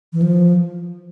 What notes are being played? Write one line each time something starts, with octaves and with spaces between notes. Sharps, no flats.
E3
F3